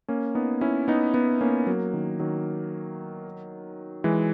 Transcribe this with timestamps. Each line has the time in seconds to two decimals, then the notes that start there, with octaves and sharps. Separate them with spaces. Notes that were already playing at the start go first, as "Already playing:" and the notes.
0.08 A#3 C#4
0.35 B3 D#4
0.61 C#4 E4
0.88 B3 D#4
1.14 B3 D#4
1.41 A#3 C#4
1.67 F#3 A#3
1.93 D#3
2.19 D#3 F#3
4.04 E3 G#3